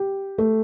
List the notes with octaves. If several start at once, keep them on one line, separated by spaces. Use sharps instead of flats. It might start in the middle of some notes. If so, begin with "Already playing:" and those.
Already playing: G4
A3